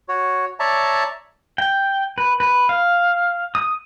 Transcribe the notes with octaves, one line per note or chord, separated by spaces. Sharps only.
F#4 C#5
C#5 D5 E5 A5 A#5
G5
B4
B4
F5
D#6